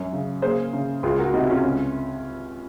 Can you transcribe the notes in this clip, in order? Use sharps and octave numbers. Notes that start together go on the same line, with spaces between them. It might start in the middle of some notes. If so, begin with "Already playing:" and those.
Already playing: F#2 F#3
C#3
A#3 G#4 C5
C#3
C#2 F4 G#4
F#4 A#4
C3 D#4 F#4
C#4 F4
C#2